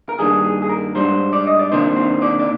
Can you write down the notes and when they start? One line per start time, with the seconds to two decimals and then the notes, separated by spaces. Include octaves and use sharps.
0.09 A#4
0.19 G2 D#3 G3 A#3 D4 G#4
0.44 G#4
0.62 G#4
0.69 A#4
0.96 G#2 G3 D4 C5
1.33 D5
1.47 D#5
1.59 D5
1.72 C3 D#3 A#3 D4 C5
1.97 C5
2.22 D5
2.39 D5